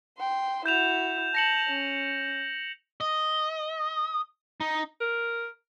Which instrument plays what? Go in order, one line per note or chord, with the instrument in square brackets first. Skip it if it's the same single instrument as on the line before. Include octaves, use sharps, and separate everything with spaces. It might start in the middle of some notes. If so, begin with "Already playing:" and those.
[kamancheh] G5 C6
[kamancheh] E4 F#4 [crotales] G6 E7 F7
[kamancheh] A5 [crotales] A#6 C#7 F#7
[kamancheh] C#4
[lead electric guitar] D#5
D#4
[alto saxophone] A#4